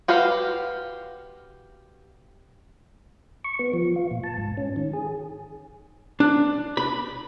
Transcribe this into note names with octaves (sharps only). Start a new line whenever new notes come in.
F#4 G4 B4 F5
C#6
B3
F3
F4
A#2
A5
G#2
C#4
D#3
G#4
D4
B5